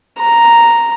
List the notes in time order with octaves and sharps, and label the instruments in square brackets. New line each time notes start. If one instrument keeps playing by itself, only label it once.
[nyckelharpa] A#5